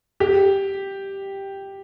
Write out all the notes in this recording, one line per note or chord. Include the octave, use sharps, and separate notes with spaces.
G4